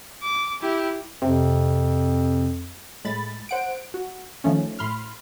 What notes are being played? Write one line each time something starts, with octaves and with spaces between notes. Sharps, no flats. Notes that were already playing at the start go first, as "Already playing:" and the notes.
D6
E4 G4
F2 C3
A2 G#3 B5 A6
C5 F#5 D7
F#4
D#3 F3 A3 C#4
A2 B5 C6 F6